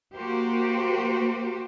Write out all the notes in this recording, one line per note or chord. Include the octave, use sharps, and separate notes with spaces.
A#3 F#4 G4 C5